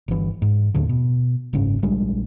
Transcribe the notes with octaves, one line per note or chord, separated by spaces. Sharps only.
G1 E3
G#2
D#2 A2 D3
B2
F#1 G#2 C#3 C#4
A#1 G3 G#3 D4